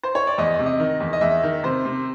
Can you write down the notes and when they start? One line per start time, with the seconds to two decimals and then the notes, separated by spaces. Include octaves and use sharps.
0.03 C5
0.15 C#5
0.27 D5
0.38 E2 D#5
0.59 C3
0.66 D#5
0.80 D#3
1.00 E2
1.13 D#5
1.21 E2 E5
1.43 D#3
1.63 C3 C5
1.85 C3